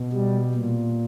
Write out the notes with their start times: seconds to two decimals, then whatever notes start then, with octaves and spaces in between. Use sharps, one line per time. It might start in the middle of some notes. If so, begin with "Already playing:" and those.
Already playing: B2
0.13 G3
0.54 A#2